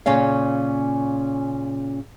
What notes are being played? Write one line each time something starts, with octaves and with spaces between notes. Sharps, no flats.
A#2 C#3 C#4 C#5 F5